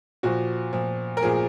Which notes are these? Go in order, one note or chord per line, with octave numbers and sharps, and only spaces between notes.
A#2 F3 F#4
A#2 F3
A#4
A#2 F3 G#4